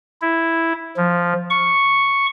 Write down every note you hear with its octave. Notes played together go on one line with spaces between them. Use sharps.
E4
F3
C#6